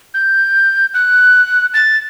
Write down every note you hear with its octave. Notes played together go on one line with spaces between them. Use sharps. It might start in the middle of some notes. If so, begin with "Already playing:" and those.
G6
F#6
A6